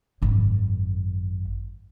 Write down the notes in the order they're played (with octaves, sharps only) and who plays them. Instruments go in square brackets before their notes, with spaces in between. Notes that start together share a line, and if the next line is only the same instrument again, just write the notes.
[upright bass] G#1 F#2